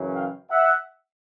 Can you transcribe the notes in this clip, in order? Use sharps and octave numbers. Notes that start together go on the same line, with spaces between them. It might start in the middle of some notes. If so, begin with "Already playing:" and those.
Already playing: F#2 C#3 E3
F5 G5
E5 F#5